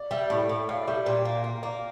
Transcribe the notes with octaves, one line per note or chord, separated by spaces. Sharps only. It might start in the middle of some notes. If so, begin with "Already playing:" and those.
Already playing: D5
G3 E5
A2
A2
G5
A2 F5
D5
G3 E5
A#2 G5
A#3
F5
A#3
A#3 D5